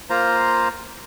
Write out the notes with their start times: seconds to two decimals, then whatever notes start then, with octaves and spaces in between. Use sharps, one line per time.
0.10 A#3 F4 C5 A#5